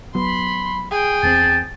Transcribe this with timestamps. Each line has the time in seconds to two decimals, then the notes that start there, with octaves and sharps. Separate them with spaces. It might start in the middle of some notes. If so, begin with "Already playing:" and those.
0.15 F#3 B3 B5 C6
0.91 G#4 G5
1.23 E2 B3 C4 A5